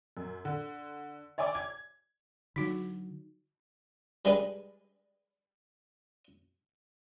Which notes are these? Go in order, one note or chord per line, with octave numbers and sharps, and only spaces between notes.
F#2
D3
C#5 D5 G5 G#5 D6
G#6
D3 F#3 D#4 F#4
G3 G#3 D4 G#4 B4